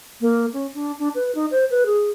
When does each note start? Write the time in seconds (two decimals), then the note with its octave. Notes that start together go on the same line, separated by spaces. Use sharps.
0.21 A#3
0.53 C#4
0.74 D4
0.99 D4
1.15 B4
1.35 D#4
1.51 C5
1.71 B4
1.86 G#4